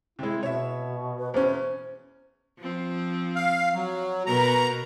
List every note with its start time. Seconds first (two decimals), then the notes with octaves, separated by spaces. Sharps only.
0.19 C3 G#3 E4
0.43 B2 C#5 E5
1.18 B4
1.34 E2 C#4 C5
2.59 F3 C4
3.36 F5
3.75 F#3
4.26 B2 A#4 B4 A#5